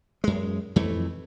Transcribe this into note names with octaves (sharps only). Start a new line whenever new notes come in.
F#2 G#3
F2 E3 A3